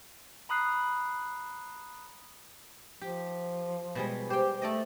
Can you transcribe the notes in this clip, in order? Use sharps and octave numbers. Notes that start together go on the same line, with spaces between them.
A#5 B5 D#6 F#6 C7
F3 G4
B2 G3 G#3
G4 C5 G5
A3 A4 D5 D#5